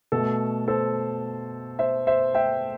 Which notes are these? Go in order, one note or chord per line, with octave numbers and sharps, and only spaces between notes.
B2 A3 A4
A4 C5
C5 E5
C5 E5
E5 G5